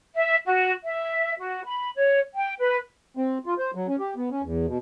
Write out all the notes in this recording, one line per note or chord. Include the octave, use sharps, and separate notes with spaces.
E5
F#4
E5
F#4
B5
C#5
G5
B4
C4
F4
C5
F#3
C#4
G4
B3
C#4
E2
B2